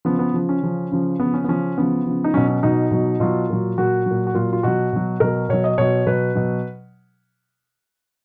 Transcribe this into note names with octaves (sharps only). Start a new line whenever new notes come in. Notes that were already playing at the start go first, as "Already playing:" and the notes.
C#3 F3 B3
B3
C#3 F3
C#4
C#3 F3
C#3 F3
C#3 B3
F3
C#4
B3
C#3 F3 C#4
C#3 F3 B3
C#3 F3
D#4
B2 F#3 C#4
C#4
B2 F#3 D#4
B2 F#3
B2 F#3 F4
A#2 F#3
A#2 F#3 F#4
A#2 F#3
F#4
A#2 F#3 F4
F4
B2 F#3 F#4
B2 F#3
B2 F#3 A#4
B2 F#3 C#5
D#5
B2 F#3 C#5
B2 F#3 B4
B2 F#3